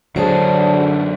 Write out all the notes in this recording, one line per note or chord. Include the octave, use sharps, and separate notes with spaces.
F#2 D3 F#3 D4 G#4 C5 A5